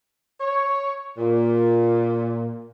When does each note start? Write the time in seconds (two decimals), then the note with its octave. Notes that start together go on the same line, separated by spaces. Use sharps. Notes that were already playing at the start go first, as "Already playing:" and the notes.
0.40 C#5
1.17 A#2